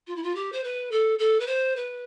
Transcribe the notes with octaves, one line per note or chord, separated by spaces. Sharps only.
F4
E4
F4
G4
C5
B4
A4
A4
B4
C5
B4